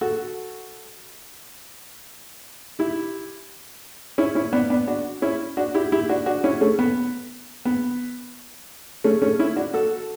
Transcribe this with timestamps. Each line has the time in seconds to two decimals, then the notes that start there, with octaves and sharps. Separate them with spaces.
0.01 F#4 A4
2.79 E4 G4
4.18 C#4 E4
4.35 C#4 E4
4.53 B3 D4
4.70 B3 D4
4.87 D4 F#4
5.22 C#4 E4
5.57 D4 F#4
5.74 E4 G4
5.92 E4 G4
6.09 D4 F#4
6.26 D4 F#4
6.44 C#4 E4
6.61 A3 C#4
6.79 B3
7.65 B3
9.04 A3 C#4
9.22 A3 C#4
9.39 C#4 E4
9.56 D4 F#4
9.74 F#4 A4